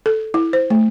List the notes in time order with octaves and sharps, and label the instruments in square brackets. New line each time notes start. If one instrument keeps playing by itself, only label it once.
[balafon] A4
E4
C5
A3